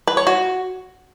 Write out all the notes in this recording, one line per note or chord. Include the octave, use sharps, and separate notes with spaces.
B4
C#5
F#4